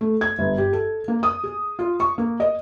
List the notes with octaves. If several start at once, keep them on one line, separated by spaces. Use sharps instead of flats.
A3
G#6
G1
G4
A4
A#3
D#6
G#4
F4
C#6
A#3
D#5